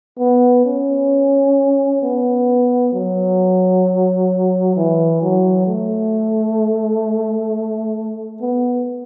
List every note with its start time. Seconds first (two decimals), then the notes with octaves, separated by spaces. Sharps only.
0.19 B3
0.65 C#4
2.02 B3
2.93 F#3
4.76 E3
5.21 F#3
5.67 A3
8.41 B3